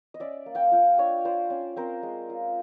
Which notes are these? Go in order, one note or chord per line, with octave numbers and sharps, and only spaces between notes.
D#5
C#4 D5 E5
A#3
F5 G5
F4 F5 G5
D4 C#5 D#5
F4 C5 D5
C#4
C4 A#4 C5
G#3
F4